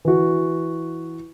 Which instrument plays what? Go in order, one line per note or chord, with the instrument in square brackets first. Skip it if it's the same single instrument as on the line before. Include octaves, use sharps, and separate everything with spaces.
[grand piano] E3 F#4